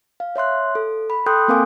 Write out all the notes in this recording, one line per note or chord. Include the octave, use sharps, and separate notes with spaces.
F5
C#5 E5 C6 F#6
A4
B5
A4 G5 C6 D#6 F#6 G6
A#3 C4 A#4 F5 G#5 D6